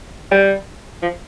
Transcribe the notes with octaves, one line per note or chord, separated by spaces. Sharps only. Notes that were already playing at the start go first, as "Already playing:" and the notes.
G3
F3